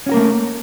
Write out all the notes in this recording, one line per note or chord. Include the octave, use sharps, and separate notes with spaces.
A3 A#3 C#4 F#4 A#4